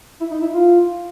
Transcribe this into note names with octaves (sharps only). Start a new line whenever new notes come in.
E4
D#4
E4
F4